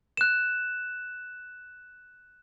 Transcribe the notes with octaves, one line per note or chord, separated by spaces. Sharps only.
F#6 E7